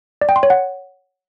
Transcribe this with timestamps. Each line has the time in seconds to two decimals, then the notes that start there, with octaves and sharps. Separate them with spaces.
0.21 D5
0.29 G5
0.36 C6
0.43 C#5
0.50 F#5